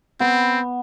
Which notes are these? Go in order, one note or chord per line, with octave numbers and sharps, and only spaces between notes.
B3 C4